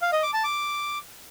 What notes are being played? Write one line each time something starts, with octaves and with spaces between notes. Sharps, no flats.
F5
D#5
D6
A5
D6